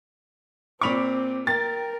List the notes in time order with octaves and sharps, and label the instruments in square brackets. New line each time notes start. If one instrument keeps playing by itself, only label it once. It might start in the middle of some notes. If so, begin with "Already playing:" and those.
[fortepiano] A#2 B5 C#6 [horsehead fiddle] C4 [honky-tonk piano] D6 F7
[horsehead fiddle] A#4 [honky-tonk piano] G5 A6